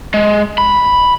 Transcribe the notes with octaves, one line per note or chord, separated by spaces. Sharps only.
G#3
B5